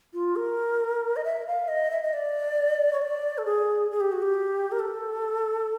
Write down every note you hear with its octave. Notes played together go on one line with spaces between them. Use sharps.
F4
A#4
D#5
E5
F5
D#5
E5
D#5
D5
C#5
D5
A4
G#4
G#4
G4
F#4
G4
A#4
A4